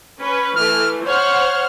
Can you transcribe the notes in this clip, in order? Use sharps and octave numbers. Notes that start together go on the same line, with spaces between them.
C#4 B4
E3 A3 F6
C5 C#5 F#5 F6